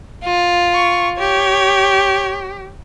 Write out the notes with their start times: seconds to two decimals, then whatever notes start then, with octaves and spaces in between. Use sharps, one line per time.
0.24 F4
0.74 C#6
1.19 G4 C#5